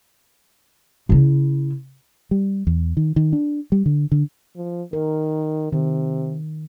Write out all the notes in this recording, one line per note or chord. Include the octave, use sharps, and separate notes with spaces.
C#3 E4
G3
E2
D#3
D#3
D4
G3
D3
D3
F3
D#3 A#4
C3 D#3